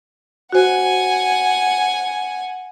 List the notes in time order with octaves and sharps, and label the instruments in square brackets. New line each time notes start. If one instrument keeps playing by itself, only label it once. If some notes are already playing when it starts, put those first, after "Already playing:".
[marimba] F#4 C5 [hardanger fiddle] F#5 G#5